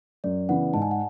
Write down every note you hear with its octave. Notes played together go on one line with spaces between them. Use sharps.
F#2 D5
C#3 E3 B3 F#5
G#2 A5
G#5
F#5